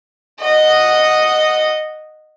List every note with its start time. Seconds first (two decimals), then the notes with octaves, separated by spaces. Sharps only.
0.41 D#5 F#5